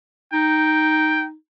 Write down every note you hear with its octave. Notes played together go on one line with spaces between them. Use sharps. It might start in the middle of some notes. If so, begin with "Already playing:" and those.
D#4 G5